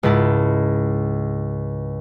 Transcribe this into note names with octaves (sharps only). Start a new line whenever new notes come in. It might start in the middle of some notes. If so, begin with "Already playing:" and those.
C#2 G#2 E4 A5